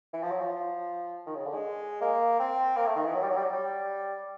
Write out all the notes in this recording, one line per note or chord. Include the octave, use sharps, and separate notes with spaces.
E3
F3
F#3
F3
D#3
C#3
D3
G#3
A#3
C4
A#3
A3
D#3
E3
F#3
G3
F#3
G3
F#3
G3